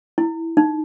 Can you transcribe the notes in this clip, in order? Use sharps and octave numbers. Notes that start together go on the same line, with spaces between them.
E4
D#4